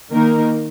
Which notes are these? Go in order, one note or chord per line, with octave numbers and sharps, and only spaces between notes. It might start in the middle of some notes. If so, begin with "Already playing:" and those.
D#3 A#3 D#4 A#4